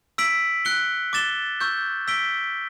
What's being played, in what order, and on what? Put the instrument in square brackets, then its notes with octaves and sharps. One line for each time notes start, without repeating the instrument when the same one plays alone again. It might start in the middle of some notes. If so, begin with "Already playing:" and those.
[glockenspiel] E6 B6 D7 F#7
F#6 C#7 G7
D6 A6 E7 G7
C#6 E6 G6
E6 B6 D7 G7